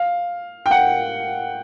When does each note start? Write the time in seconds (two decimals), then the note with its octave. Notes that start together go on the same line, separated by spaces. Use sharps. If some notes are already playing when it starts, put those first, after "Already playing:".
Already playing: F5
0.66 G5
0.71 F#5